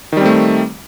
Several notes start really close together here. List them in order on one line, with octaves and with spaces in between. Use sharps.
D#3 G3 C4 A3